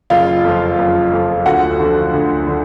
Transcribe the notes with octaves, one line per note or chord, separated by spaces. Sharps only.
F#1 F4 F5
F2
F3
F#1
F2 F3
D2 F#4 F#5
D3 F3
D2
D3